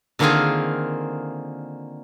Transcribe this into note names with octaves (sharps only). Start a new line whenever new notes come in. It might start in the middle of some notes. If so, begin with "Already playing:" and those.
D3 D#3 A#3 C4 F4 G#4